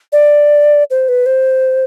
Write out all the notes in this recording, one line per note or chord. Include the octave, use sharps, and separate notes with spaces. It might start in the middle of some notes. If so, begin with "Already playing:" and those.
D5
C5
B4
C5